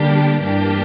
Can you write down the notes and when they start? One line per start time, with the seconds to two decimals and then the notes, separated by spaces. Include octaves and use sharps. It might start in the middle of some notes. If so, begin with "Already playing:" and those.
Already playing: D3 G3 A#3 D4 G4
0.42 G2 E3 A#3 D4 G4